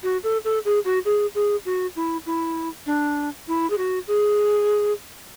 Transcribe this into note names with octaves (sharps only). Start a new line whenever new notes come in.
F#4
A4
A4
G#4
F#4
G#4
G#4
F#4
E4
E4
D4
E4
G#4
F#4
G#4